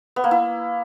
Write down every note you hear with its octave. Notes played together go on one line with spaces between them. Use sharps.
B3
A#3
E4